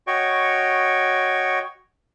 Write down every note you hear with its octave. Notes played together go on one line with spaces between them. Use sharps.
F#4 C#5 D#5 G5 C#6